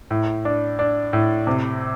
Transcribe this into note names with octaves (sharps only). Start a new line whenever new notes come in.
A2
D4
D4
A2
C3